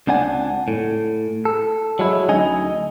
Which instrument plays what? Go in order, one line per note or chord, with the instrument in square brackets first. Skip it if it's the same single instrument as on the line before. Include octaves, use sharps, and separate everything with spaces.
[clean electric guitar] C#2 C4 D4 F#5 G#5
A2
A4
F#3 G#3 E4
D2 F#3 C#4 D#4 D#5 G#5